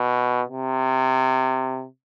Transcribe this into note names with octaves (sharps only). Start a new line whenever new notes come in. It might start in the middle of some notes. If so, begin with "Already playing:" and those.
Already playing: B2
C3